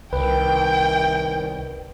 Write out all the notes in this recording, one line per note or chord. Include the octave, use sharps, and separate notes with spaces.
C2 D#3 B4 G5